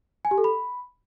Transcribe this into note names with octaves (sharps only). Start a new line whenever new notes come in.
G#5
G4
A4
B5